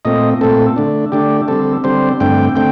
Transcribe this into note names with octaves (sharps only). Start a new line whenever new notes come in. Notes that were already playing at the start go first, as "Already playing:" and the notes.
A#2 A3 C4 D#5
A#2 A3 C4 A4
D3 A3 D4
D3 A3 D4 G4
D3 G3 C4 A4
D3 G3 C4 C5
G2 D3 A3 C4 G5
D3 A3 C4 G5